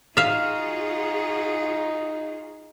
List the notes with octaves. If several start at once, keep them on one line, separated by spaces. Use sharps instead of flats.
D#4 F4 F#4 G#4 E5 F5